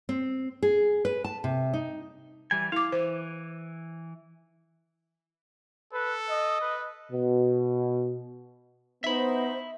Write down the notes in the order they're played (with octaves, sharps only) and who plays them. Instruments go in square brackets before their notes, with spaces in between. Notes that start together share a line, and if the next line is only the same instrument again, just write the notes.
[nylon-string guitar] C4
G#4
B4
A5
C3
D#4
[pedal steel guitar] E3 G3 G#5
[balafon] E4 D6 [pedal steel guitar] F5
[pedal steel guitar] E3 [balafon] C5
[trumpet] A4 [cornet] B4
[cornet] D#5
[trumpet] B4
[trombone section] B2
[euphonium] B3 [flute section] D#4 C5 [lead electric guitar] E5 B5